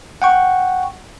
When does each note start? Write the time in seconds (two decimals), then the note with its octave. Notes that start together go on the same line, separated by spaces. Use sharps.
0.22 F#5 G5 C#6